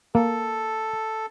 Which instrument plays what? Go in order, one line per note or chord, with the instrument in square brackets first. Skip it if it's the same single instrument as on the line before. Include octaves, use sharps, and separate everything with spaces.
[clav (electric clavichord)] A#3 [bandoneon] A4